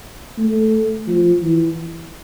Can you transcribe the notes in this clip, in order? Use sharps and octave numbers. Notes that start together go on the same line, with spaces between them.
A3
F3
E3